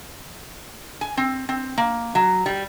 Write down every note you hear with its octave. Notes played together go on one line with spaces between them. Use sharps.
G#5
C4
C4
A#3
F#3
G3